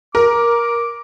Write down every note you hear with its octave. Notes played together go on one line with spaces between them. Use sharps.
A#4 D6